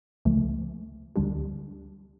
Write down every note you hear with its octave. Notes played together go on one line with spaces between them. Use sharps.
C#2 C#3 F3 A3
D2 D3 G3 D4 G4